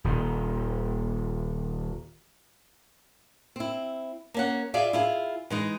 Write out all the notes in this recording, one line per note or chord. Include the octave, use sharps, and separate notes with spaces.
D#1 D#3
C4 E4
A#3 C#4 F#5
F4 G#4 D5 E5 F5
E4 F4 G#4
E3 G#3 D#4